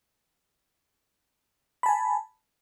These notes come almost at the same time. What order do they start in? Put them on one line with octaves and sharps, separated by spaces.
B5 A5 G#5